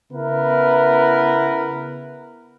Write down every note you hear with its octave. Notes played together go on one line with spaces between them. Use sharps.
C#3 B3 E4 A#4 B4